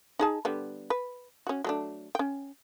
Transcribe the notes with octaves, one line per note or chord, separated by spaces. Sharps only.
D#4 G#4 A5
D3 G3 B3
B4
C#4 F#4
F#3 A3 D4
C#4 G5